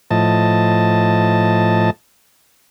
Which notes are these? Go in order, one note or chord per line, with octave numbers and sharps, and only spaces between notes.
A2 F3 D#5 A5